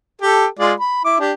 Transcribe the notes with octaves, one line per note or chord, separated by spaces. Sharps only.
G4 A4
G#3 F4 D5
B5
E4 D6
D4 G4